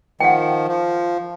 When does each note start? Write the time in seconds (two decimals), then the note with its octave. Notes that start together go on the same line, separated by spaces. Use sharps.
0.20 D#3 F3 F#5 G5
0.68 F3